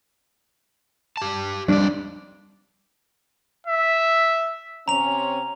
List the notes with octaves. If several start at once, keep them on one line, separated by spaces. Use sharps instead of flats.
G4 A5
F2 G3 D4 D5
E5
C3 C4 C#4 A#5 F7